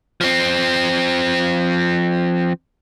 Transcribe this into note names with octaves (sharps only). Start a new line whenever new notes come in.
F3 C4